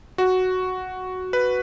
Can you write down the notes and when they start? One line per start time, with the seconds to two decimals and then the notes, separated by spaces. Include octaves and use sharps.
0.18 F#4
1.33 B4